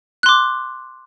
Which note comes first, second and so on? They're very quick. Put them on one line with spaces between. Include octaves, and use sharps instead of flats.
F#6 C6 D6